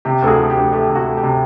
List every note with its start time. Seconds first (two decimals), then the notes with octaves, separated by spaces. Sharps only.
0.05 C3 G4
0.22 D2 A4
0.28 F#4 G#4
0.38 F3
0.50 G4
0.56 D2
0.72 A3 G4
0.90 C3
0.95 F#4
1.06 A3
1.17 G4
1.23 C3